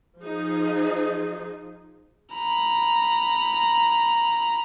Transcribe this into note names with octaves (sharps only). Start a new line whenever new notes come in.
F3 D#4 G#4
A#5 B5